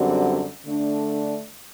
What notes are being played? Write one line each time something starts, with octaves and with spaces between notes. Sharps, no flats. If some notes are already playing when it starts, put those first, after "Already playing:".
Already playing: F#2 D3 G3 C4 F#4
D3 A3 D4